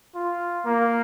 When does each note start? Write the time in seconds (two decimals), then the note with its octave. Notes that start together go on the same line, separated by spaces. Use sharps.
0.15 F4
0.65 A#3